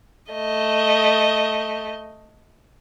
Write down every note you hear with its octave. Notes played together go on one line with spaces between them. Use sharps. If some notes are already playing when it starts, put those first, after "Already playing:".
A3 D#5